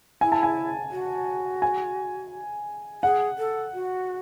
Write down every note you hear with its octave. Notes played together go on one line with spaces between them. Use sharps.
E4 G#5
A5
G#5
F#4
G#5
G#4 F#5
A4
F#4